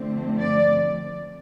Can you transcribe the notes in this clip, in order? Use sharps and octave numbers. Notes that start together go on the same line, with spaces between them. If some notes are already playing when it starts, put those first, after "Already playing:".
Already playing: D3 F3 A3 C4
D5